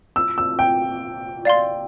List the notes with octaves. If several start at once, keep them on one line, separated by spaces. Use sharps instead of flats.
E6
E6
G5
D5 F5 C6